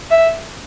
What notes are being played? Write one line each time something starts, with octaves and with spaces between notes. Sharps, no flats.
E5